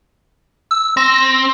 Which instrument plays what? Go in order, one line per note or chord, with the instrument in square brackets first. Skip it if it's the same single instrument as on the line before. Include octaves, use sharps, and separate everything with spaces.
[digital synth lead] E6
[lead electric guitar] C4 [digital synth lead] A#6